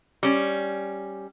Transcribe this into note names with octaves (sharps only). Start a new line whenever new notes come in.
G3 C#4